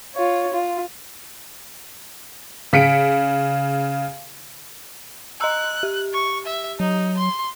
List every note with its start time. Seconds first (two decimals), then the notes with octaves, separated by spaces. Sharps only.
0.15 F4 C#5
0.54 F4
2.73 C#3 B6 C#7 D7
5.41 D#5 A#5 E6 F#6
5.83 G4
6.14 C#6
6.46 E5
6.80 F#3 D#4
7.18 C6